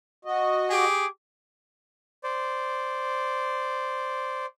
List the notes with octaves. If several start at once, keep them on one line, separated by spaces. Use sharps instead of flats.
F#4 D#5
G4 G#4 D6
C5 D5